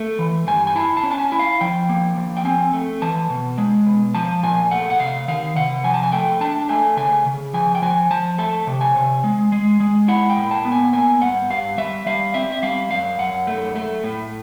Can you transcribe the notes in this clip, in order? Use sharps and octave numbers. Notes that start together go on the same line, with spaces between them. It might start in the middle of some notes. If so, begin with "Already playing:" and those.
Already playing: A3
E3
G2 G#5
G#5
E4 A5
A5
C#4
A5
G#5
E4
F5
F3 G5
A#3
F3
G5
C4 G#5
A3
E3 A5
B2
G#3
B2
F3 A5
A#2 G#5
A3 F#5
F#5
C3 F5
D#3 F5
C3 F#5
F3 G#5
A5
G#5
A3 G5
D4 A5
A3 G#5
C#3 G#5
C#3
F3 G#5
G5
F3 G#5
F3 A5
A3 A5
C3
G#5
C3
G#3
G#3
G#3
E4 F#5
G5
A#2
A5
B3
G#5
A#3 G#5
G2 F#5
G2 F5
G3 E5
G3 F5
C4 E5
E5
G3 F5
F#2 F5
F#2 F#5
A3
A3
A2